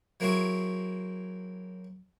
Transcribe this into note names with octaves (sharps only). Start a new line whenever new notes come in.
F#3 A#3 C4 E4 F#4 G#4